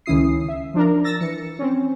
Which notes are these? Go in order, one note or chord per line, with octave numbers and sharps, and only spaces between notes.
C#2 D#3 C#4 E4 D#6 C7
E5
F3 D4 A#4
E6 A6 A#6
E3 C#7
C4 C#4